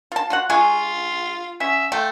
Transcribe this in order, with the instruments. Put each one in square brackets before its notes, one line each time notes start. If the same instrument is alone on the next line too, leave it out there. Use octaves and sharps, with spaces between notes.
[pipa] F4 A5
F4 F#4 F#5
[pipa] G#3 G#5 C#6 [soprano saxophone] F4
[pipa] C#4 [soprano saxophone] E5
[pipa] A3 F4 [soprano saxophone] G5